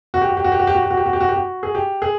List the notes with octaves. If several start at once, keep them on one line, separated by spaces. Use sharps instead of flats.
F#4
G4
F#4
G4
F#4
G4
F#4
G4
F#4
G4
F#4
G4
F#4
G4
F#4
G4
F#4
G#4
G4
G#4